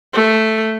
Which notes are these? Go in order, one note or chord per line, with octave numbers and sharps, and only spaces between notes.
A3